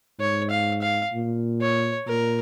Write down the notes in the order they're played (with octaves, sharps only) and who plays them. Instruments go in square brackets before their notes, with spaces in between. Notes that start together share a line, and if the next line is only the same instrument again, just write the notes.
[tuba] G#2 [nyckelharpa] C#5
[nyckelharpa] F5
F5
[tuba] A#2
[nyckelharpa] C#5
[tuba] A#2 [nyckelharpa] A#4